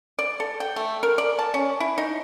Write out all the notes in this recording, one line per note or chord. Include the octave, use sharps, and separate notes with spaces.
D5
A4
G5
A3
A#4
D5
A5
C#4
E4
D#4